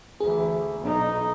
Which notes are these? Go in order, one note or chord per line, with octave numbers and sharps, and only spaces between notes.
D2 E3 G#4
B1 D#4